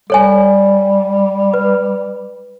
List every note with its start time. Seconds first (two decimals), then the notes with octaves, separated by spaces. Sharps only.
0.10 G3 A4 C#5 G#5
1.54 B4